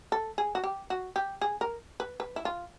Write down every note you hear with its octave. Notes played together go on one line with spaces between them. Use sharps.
A4
G#4
F#4
G4
F#4
G4
G#4
A#4
B4
B4
E4
F4